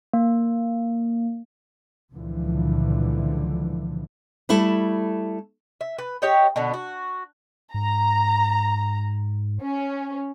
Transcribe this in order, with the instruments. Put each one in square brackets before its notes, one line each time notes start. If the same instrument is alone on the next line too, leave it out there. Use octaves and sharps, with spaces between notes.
[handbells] A#3
[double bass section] C#2 A#2 D3 E3 F3
[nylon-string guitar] G3 A3 E4 A4
[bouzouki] E5
B4
G4 C#5 D#5 G5
B2 D3 B3
F#4
[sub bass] G#2 [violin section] A#5
[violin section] C#4